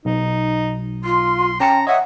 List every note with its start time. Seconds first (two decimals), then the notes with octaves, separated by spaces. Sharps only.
0.05 B1 D#4
1.04 F4 C6
1.60 C#4 G5 A5 A#5 C#7
1.87 C#5 D#5 E5 F#5 D#6